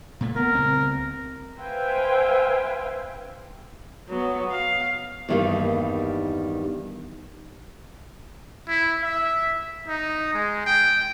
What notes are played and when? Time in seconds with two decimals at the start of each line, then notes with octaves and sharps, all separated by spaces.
0.21 A#2 A3
0.36 B3 A#4
0.54 C#2 C4
1.57 B4 C5 E5 F5 G5 G#5
4.09 F#3 B3
4.51 F5
5.29 E2 G2 D#3 G3 A#3
8.68 E4
9.03 E5
9.88 D#4
10.34 G#3
10.66 G5